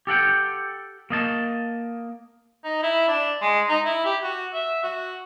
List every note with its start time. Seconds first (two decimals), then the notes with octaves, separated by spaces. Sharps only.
0.07 G4 A4 F#5 G5
1.10 A#3 D#5 A5
2.64 D#4
2.83 E4
3.08 D4
3.42 G#3
3.69 D#4
3.85 E4
4.05 G4
4.23 F#4
4.54 E5
4.83 F#4